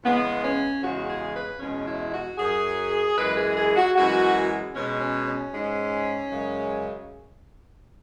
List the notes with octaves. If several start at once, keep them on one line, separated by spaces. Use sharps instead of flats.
E2 C#3 G#3 B3
C#4
E2 C#3 G#3 F#4
G#4
B4
E2 B2 G#3 C#4
E4
F#4
F#2 F#3 G#4
F#2 E3 G#3 B4
G#4
G#4
F#4
F#2 E3 G#3 F#4
B2 G#3 C#4
C#4
C#4
G#2 G#3
F#2 C#3 G#3